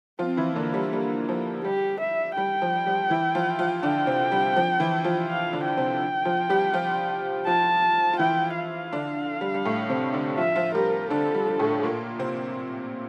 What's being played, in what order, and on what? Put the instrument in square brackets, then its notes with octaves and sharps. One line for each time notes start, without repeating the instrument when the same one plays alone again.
[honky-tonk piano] F3 F4 [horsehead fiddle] C4
[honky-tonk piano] E3 E4
[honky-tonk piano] D3 D4 [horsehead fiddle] A#3
[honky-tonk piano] G3
[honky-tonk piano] G3 [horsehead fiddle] A#3
[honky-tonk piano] F3
[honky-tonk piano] G3 [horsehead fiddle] G4
[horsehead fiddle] E5
[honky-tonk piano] G3 [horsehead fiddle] G5
[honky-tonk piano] F3
G3
E3 E4
F3 F4
F3 F4
[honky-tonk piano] D3 D4 [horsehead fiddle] G5
[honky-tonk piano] C3 C4
G3
F3
E3 E4
F3 F4
[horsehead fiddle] F5
[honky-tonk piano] D3 D4
[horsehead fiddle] G5
[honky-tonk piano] C3 C4
F3 F4
G3 G4
F3 F4
[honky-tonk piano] F3 F4 [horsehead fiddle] A5
[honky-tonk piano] F4
[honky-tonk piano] E3 E4 [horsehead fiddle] G5
[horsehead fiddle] F5
[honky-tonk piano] D3 D4
G3
G3
A2 A3
C3 C4
D3 D4
[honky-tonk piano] F3 F4 [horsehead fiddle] E5
[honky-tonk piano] F3 F4
[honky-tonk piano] G3 G4 [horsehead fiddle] A#4
[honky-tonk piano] D3 D4 [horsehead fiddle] A4
[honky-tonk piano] G3
G3
A2 A3
A#2 A#3
C3 C4